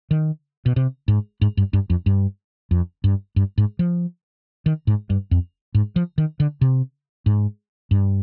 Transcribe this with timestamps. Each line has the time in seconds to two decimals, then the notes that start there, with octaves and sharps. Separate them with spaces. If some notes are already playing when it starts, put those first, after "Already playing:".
0.11 D#3
0.66 B2
0.76 C3
1.08 G#2
1.41 G#2
1.57 G2
1.73 G2
1.90 F2
2.06 G2
2.71 F2
3.04 G2
3.36 G2
3.58 G#2
3.79 F3
4.66 D#3
4.87 G#2
5.10 G2
5.31 F2
5.75 G#2
5.96 F3
6.18 D#3
6.40 D3
6.61 C3
7.26 G#2
7.91 G2